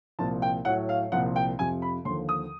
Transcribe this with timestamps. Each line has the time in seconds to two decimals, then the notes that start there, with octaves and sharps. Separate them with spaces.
0.19 C2 A#2 F3 A5
0.42 G5
0.65 A2 F#3 F#5
0.89 F5
1.12 C2 A#2 F3 F#5
1.36 G5
1.59 F2 C3 F3 G#5
1.82 B5
2.05 D#2 D3 F3 C6
2.29 D#6